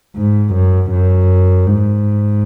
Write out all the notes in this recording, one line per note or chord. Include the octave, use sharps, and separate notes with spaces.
G#2
F#2
F#2
G#2